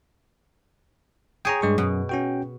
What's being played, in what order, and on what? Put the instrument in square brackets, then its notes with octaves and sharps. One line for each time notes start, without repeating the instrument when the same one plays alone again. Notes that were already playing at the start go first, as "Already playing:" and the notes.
[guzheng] G#4 C#5 [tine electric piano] G5 G#5 A#5
[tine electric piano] G2 G#3 C#6
[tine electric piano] F#2 [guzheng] B2
[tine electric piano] C#4 F#4 G5